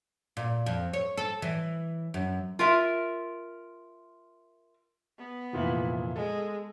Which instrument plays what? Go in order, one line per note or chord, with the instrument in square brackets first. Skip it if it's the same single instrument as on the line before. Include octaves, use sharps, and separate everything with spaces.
[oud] A#2
F2
C#5
A4
E3
F#2
[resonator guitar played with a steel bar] F4 A#4 E5
[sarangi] B3
[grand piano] F1 A#2 E3
[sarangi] G#3 [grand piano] A4